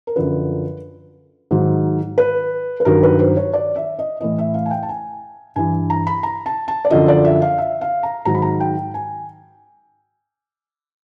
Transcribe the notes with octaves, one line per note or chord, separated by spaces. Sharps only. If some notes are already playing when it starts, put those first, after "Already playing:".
A#4
F#2 D3 F3 B4
G#2 D#3 F#3
B4
B4
G2 D#3 F#3 A#4
B4
C5
C#5
D5
E5
D#5
A2 E3 D#5
E5
F5
G#5
G5
A5
G#5
G2 E3 G#5
A#5
B5
A#5
A5
A5
D5
F#2 D3 F3 D#5
D5
E5
F5
E5
F5
A#5
G#2 D#3 F#3 A#5
B5
A#5
G5
G#5